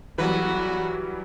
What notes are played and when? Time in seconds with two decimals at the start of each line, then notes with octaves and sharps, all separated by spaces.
0.18 E2 E3 F#3 G3 B3 F#4 B4